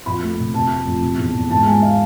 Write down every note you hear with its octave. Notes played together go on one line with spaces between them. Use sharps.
F2 B5
A3
F1
C3 A5
A3
F2
C3
E2
E2
G#2 A5
G#3 G#5
F5